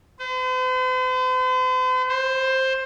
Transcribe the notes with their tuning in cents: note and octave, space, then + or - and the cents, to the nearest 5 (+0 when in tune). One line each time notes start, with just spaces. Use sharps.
C5 -45
C5 +10